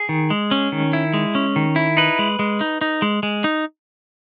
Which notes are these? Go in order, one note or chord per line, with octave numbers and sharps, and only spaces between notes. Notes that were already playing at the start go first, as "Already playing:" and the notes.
Already playing: G#4
D#3
G#3
C#4
D#3
E4
G#3
C#4
D#3
E4
D#4 B4
G#3
G#3
D#4
D#4
G#3
G#3
D#4